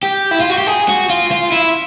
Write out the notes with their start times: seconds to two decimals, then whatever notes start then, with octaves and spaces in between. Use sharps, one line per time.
0.03 G4
0.31 E4
0.40 F4
0.50 F#4
0.58 G4
0.67 G#4
0.89 F#4
1.10 F4
1.31 F4
1.52 E4